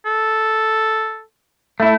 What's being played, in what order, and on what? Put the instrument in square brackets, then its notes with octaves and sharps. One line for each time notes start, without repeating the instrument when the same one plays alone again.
[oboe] A4
[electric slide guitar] A3 E4